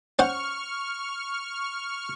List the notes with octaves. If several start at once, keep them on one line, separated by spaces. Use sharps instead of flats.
C#4 C5 F#5 C#6 F6